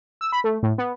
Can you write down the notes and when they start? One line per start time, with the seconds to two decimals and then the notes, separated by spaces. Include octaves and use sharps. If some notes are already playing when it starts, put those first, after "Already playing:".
0.21 E6
0.32 B5
0.44 A3
0.63 A2
0.78 B3